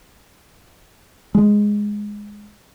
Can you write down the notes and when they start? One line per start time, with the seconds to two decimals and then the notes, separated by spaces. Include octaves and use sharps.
1.35 G#3